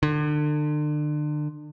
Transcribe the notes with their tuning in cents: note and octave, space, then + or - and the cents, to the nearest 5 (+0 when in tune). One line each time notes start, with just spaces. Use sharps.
D3 +35